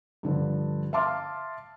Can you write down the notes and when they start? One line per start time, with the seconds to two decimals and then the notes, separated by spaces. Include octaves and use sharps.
0.23 G2 D3 F3
0.93 E5 F5 A5 C6 D6 F6